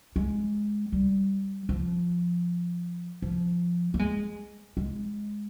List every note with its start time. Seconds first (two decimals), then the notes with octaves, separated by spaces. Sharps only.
0.16 G#3
0.92 G3
1.69 F3
3.22 F3
3.94 A#3
3.99 G#3
4.77 G#3